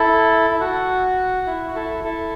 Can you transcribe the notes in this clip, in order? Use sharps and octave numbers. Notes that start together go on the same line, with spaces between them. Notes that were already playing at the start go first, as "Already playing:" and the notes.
Already playing: E4 A4
E4
F#4
E4
F#4
E4 A4
E4 A4